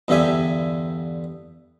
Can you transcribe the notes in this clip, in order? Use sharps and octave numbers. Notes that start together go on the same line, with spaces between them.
E2 G2 D3 G4 E5 G#5